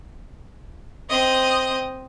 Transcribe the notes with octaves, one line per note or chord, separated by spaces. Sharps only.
C4 D#5